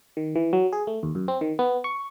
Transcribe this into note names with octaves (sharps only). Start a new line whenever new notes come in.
D#3
E3
F#3
G#4
A3
D#2
F#2
C4
D#3
B3
C#6